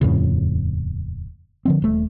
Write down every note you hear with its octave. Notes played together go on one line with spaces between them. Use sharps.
D#1 F2 A2 C#3
D3 F3 C4
D#1 A3